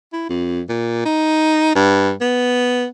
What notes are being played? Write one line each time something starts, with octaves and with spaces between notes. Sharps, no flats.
E4
F2
A#2
D#4
G2
B3